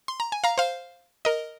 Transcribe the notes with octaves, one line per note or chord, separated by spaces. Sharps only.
C6
A#5
G#5
F5 A#5
C5 F5
A#4 D#5